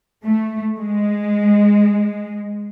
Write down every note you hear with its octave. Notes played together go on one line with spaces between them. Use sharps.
A3
G#3